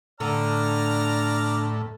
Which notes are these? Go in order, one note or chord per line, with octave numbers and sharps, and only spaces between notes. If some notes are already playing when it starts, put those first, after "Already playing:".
A2 D3 D5 A#5 F6